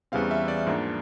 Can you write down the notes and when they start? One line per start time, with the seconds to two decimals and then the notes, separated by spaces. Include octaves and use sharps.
0.12 E2 C#3 E3 G3 C4 F5
0.31 E5
0.48 D5
0.66 G#2 F3 A#3 D4